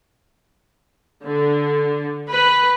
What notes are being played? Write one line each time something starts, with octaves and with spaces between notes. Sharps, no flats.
D3
B4